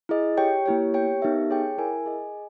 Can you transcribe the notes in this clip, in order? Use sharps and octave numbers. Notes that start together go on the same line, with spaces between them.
E4 G#4 D#5
G4 C#5 G5
A#3 E4 G4 C#5
B3 G4 C#5 G5
B3 D#4 G4 A#4 E5
G#4 C#5 G5
E4 A#4 E5 G#5
G#4 D#5 G#5